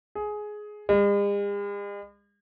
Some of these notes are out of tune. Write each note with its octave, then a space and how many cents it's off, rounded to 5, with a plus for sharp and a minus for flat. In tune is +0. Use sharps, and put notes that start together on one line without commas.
G#4 +15
G#3 -45